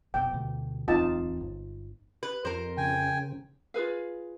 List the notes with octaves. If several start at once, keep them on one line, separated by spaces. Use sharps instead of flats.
F1 B2 G5
D2 B2 D3
D1 E2 C4 D#4 F4 A5
G1
B4
F2 A#4 C5
C#3 G5 G#5
F4 G#4 B4 F5